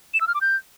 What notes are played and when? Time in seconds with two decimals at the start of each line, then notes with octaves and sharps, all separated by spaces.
0.14 E7
0.21 E6
0.28 F6
0.34 D6
0.41 G6